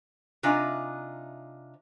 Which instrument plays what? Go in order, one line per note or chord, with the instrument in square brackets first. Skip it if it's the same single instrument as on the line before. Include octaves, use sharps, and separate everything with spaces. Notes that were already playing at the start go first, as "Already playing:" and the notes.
[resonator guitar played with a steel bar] C3 D4 D#4 F4 G#5